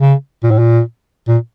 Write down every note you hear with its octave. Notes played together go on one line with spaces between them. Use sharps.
C#3
A#2
A2
A#2
A#2